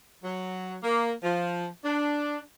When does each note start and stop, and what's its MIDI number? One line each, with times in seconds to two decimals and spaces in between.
0.24 0.77 54
0.83 1.11 58
1.23 1.66 53
1.85 2.40 62